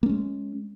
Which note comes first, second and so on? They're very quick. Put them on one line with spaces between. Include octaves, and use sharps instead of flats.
A#3 C#4 G#3